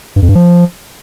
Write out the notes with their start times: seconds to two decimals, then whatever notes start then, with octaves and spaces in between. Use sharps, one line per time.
0.16 G2
0.22 F2
0.29 G2
0.35 F3